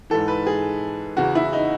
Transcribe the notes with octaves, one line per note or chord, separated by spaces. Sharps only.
G#2 E3 A4
B4
G#4
E2 C#3 E3 F#4
E4
D#4